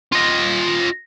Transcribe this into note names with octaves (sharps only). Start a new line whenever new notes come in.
F4 D#5